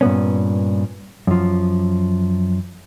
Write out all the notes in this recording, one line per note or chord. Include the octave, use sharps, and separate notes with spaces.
G2 A#2 B3 C#4
F#2 F3